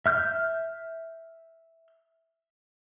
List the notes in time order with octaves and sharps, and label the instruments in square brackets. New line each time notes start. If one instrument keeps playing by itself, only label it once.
[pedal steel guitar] E5 F6 G6